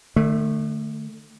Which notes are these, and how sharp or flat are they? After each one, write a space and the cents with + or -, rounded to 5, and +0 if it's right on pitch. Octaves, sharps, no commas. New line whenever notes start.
D3 +45 A3 +0